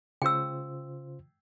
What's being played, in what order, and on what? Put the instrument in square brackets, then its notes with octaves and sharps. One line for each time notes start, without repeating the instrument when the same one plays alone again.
[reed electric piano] C#3 F4 C5 [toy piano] G5 E6